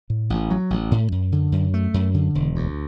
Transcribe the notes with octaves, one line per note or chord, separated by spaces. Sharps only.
A2
A1
F#3
A1
A2
F#2
D3
F#2
A3
F#2
D3
E1
D2